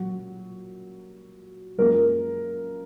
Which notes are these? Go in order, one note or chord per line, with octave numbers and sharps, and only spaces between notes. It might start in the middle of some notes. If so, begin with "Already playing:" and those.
Already playing: A#2 F#3 A#3 F#4
F#2 F3 G#3 A#3 A#4